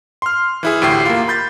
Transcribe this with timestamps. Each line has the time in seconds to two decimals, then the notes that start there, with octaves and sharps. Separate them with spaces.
0.22 C6 F6
0.63 E3 E4 G#4
0.82 D2 A2 G4 C7
1.06 A#3 F4
1.28 B5 G6 A6